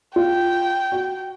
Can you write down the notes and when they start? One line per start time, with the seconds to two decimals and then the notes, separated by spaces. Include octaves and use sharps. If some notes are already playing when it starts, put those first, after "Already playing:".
0.16 F4 G5
0.92 F#4